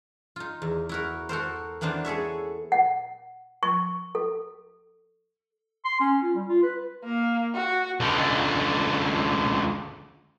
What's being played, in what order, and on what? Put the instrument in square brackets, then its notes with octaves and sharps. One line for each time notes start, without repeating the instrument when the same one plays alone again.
[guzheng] D#4 F4
E2
E4 F#4 A#4
F#4 A4 A#4 C5
E3 A#3 B3 D4 C5
G#4 A4 C#5 E5
[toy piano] F#5
C#6
A4
[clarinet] C6
C#4
F4
G3
F4
B4
[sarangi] A#3
F#4
[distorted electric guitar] C#2 D3